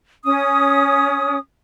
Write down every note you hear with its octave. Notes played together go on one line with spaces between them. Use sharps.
C#4 D#6